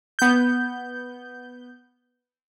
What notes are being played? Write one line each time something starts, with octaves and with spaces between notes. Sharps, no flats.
B3 G6